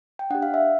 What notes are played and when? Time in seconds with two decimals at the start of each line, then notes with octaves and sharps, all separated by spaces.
0.19 G5
0.30 D4 F#5
0.35 G4
0.42 F5
0.54 E5